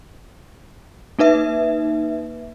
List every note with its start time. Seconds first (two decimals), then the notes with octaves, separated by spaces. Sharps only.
1.19 A#3 D#4 B4 E5